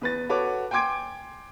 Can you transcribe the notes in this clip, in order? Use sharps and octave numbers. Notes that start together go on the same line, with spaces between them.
E2 B4 A6
F#4 A4 B4 C#5 F#5 D6
G5 G#5 C6 D6 G#6 D7